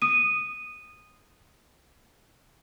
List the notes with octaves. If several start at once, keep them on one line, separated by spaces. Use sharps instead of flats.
D#6 D#7